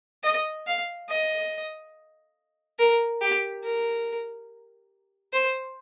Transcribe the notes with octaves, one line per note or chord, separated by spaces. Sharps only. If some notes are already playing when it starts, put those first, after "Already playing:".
D#5
F5
D#5
A#4
G4
A#4
C5